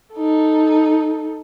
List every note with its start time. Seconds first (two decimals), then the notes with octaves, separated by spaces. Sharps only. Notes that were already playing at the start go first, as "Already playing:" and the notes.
0.15 D#4 A4